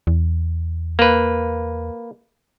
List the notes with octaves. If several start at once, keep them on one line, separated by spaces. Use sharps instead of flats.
E2
A#3 B4